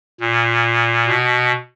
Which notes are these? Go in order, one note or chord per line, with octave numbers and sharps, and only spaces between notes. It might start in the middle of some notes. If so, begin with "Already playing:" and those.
A#2
B2